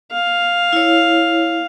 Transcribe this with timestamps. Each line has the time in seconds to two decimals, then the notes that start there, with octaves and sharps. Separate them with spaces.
0.11 F5
0.73 E4 C#5